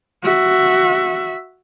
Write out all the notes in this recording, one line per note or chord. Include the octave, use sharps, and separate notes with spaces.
F#4 E5